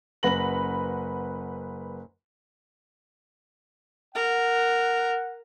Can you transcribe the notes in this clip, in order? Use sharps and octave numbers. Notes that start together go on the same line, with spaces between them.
F#1 B4 F#5 B5 A#6 F#7
A#4 F#5